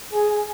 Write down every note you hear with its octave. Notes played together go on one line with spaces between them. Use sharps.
G#4